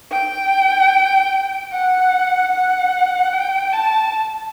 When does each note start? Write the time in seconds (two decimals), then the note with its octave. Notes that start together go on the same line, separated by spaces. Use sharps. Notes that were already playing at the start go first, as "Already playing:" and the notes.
0.11 G5
1.72 F#5
2.52 F#5
3.33 G5
3.73 A5